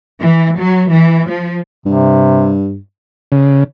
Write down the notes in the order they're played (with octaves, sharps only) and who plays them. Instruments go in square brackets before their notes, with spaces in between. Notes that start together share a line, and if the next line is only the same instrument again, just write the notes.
[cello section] E3
F#3
E3
F3
[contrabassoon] G2 [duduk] C3
[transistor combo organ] C#3